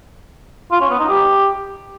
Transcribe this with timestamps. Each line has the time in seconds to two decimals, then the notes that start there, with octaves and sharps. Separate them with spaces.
0.72 F4
0.81 C#4
0.90 B3
0.99 D#4
1.09 G4